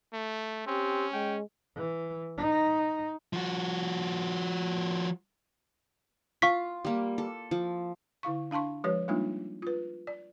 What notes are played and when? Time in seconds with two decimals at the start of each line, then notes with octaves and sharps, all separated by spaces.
0.13 A3
0.67 C4 C#4 G4
1.13 G#3 G5
1.75 E3
2.38 D#4
3.33 F3 F#4
6.42 F4 F5 C#6 B6
6.85 G3 A#3
7.18 A4
7.51 F3
8.23 D3 E4 F5 C#6
8.51 D4 F5 A5 C6 C#6
8.84 F3 G#3 G4 B4 C#5
9.08 G3 G#3 A#3 D4 D#4 F4
9.62 F4 B4
10.07 D5